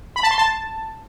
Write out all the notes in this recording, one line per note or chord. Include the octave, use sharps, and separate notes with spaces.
B5
A5
C6
A5